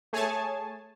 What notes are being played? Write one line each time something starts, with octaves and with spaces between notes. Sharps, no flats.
A3 G#4 C#5 G#5 A5